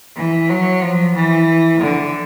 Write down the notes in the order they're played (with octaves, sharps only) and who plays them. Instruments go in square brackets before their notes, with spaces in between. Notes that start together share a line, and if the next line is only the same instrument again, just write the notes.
[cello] E3
F#3
F3
E3
D3